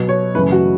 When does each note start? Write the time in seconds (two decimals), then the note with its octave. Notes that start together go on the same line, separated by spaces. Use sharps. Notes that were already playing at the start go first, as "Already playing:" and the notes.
Already playing: B2 F#3 B3
0.09 C#5
0.34 F#2 C#3 E3 A3 B4
0.52 F#4